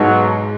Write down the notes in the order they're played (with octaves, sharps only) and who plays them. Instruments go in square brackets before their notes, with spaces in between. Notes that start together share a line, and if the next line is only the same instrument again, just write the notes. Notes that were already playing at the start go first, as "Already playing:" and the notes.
Already playing: [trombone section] B1 B2 F#3 [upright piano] G#2 G#3